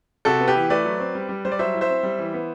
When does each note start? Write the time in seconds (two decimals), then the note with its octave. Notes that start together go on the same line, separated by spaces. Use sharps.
0.25 C3 F#4 A4
0.40 B3
0.48 G4 B4
0.55 E3
0.70 A3 B4 D5
0.85 F#3
1.00 C4
1.15 G3
1.29 G3
1.45 G3 C5
1.52 D5
1.59 F#3 C5 E5
1.74 E4
1.81 C5 E5
1.90 C4
2.03 G3
2.19 E3
2.34 B3